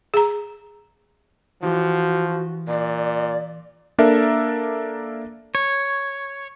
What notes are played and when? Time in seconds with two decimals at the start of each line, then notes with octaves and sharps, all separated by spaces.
0.14 G#4 A#5
1.63 E3 F3 F#4 G4
2.68 A#2 D5
3.98 A#3 D4 A4 A#4 E5
5.55 C#5